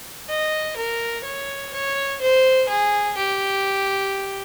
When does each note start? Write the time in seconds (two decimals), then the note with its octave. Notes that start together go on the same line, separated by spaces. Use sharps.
0.29 D#5
0.77 A#4
1.24 C#5
1.73 C#5
2.20 C5
2.68 G#4
3.17 G4